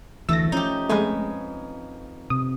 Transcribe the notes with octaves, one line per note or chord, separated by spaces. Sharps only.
D2 E3 A3 E6 A#6
F3 C#4 D#4 G4
F2 G#3 A3 B4 G#5
C3 D#6